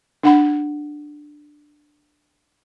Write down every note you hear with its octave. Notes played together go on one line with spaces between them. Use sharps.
D4 F#5 B5